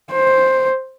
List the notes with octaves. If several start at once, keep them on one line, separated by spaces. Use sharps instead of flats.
C5